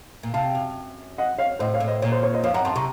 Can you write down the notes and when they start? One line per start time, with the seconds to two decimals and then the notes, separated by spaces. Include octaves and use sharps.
0.23 A#2
0.34 C3 F5 A5
0.55 F#2
1.18 D#5 F#5
1.38 C#5 F5
1.59 A2 C5 D#5
1.74 C#5 F5
1.80 A2
1.87 C5 D#5
2.02 A#2 C#5
2.12 C5
2.23 C#5
2.34 C5 D#5
2.44 F2 C#5 F5
2.54 F#2 F#5 A#5
2.65 F#2 A5 C6
2.76 C3 A#5 C#6